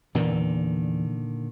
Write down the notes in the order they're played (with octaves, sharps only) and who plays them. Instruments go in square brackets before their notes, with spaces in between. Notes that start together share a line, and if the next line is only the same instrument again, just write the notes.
[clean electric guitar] E2 [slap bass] A#2 D3 D#3